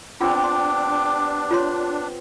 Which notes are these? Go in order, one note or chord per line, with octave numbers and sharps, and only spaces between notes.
B3 C4 D4 F4 G4 D6
C6
F4 C#5 C6